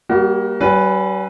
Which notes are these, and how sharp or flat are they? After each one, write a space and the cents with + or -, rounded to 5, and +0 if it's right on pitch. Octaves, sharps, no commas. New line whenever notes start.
G3 +0 A#3 +15 F#4 +35
G3 -40 C#4 +0 B4 +0